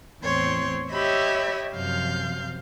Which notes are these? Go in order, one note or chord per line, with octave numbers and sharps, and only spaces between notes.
E2 A2 C4 C#5 C6
G4 C#5 D#5 E5 B5 E6
F#2 C3 F3 F5 F6 G6